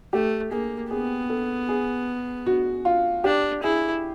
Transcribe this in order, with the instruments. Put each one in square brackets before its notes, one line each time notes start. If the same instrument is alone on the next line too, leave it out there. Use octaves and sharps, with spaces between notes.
[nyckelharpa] A3 [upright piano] G4
[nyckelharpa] A#3 [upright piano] G#4
[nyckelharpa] B3 [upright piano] G#4
[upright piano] A4
G#4
F#4
F4
[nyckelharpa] D4 [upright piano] G4
[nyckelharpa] E4 [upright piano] G#4